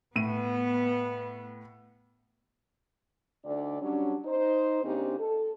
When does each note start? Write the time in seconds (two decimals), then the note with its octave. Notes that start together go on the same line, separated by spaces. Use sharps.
0.16 A2 B3 D#7
3.45 D2 D3 D4 D#4 D5
3.81 F#3 G3 C#4 D4
4.25 D#4 C5
4.84 C#3 A#3 C4 D4 D#4 G4
5.19 A4